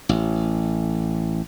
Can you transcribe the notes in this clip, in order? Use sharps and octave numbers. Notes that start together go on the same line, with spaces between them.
A1